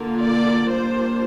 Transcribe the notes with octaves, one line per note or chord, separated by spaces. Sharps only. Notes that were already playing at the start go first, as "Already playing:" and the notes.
Already playing: D3 A#3 F4
D5
G3 A#3 D4 F4 C5